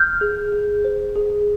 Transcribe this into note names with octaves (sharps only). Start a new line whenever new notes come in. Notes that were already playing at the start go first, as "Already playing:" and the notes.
Already playing: F6 G6
G#4
G#4
C5
G#4